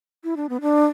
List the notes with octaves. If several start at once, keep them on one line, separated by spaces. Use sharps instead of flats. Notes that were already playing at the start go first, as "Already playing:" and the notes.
E4
D4
B3
D4